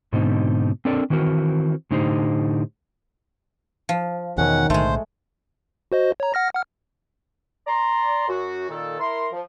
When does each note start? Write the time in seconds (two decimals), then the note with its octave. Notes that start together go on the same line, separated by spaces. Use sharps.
0.13 G#2 B2 D3 C4 D#4
0.85 C4 D4 A4 A#4 D5
1.10 D#3 E3 C4 F#4 A#4
1.91 A2 D3 D#4 G4 C5
3.89 F3
4.38 E2 B2 D#3 C#4 F#5
4.70 B1 A2 D3 G#3 A3 C5
5.92 F#4 C5 D#5
6.20 C#5 A#5
6.34 F#5 F6 A#6
6.54 F#5 F6
7.67 D5 A#5 C6
8.28 F#2 F#4
8.70 A#2 D#3 A4
9.00 E4 A#4 C6
9.32 F3